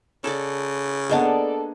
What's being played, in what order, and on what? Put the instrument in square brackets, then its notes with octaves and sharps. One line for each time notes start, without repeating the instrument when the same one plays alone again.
[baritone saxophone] C#3 [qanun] A4 D5
[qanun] A#3 B3 D4 [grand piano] G#4 D#5 F#5 [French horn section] A4 D5